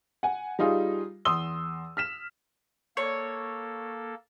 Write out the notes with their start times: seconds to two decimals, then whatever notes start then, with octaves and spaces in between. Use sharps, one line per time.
0.23 F#5 G#5
0.59 G3 D#4 F4 G#4
1.25 E2 C6 D#6 E6 G7
1.97 F6 B6 E7
2.97 A#3 A4 C#5